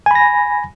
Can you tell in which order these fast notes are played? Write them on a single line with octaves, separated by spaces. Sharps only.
G#5 B5 A#6